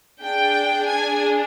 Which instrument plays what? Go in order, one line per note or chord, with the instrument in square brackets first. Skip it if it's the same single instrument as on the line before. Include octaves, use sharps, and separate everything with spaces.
[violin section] D4 G#4 G5
G#5